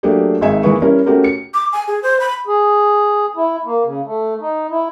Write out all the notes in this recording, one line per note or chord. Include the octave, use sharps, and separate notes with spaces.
F#3 A3 A#3 D4 G4 G#4
G#1 G#3 D#4 E5 G#5
E3 A#3 E4 G#4 B4 C#6
G3 C#4 E4 A#4
A3 C#4 F#4 G4 A#4
C#7
D6
G#5
G#4
C5
B5
G#4
E4
A#3
C#3
A3
D#4
E4